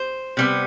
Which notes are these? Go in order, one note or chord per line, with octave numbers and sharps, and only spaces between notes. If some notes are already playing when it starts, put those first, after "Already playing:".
Already playing: C5
C3 G3 B3